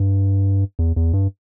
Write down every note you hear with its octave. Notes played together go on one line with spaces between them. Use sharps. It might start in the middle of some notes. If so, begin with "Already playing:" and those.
Already playing: G2
E2
E2
G2